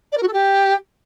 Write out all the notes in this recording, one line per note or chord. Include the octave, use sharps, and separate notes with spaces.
D5
A#4
F#4
A4
G4